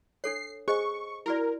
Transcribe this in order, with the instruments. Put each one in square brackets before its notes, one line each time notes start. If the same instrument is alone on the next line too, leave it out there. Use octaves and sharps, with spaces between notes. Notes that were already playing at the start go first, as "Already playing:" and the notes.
[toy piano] D4 A4 C#5 [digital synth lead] C7
[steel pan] G#4 [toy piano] C5 D#5 [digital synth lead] C#6
[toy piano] E4 F#4 D5 [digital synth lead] A#4